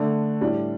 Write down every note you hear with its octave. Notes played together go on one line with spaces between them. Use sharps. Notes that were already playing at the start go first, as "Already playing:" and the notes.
Already playing: D3 A3 D4
A2 G3 D4